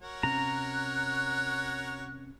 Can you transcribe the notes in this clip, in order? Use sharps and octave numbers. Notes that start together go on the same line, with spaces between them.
F#4 A#4 C#5
C3 C4 C#4 A#5 F#6